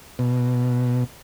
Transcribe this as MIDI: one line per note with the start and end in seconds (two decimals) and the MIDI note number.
0.19 1.04 47